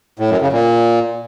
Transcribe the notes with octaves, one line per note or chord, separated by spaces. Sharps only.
A2
F#2
C#3
A#2